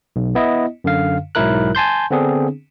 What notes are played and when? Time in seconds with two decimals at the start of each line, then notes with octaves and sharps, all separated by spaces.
0.16 B1
0.35 B3 E4 D#5
0.84 F#2 D3 F5
1.35 B1 G#2 F#3 E4 A#4 F#6
1.75 G#5 A5 C6 G6
2.10 D3 B3 C4 D4 G#4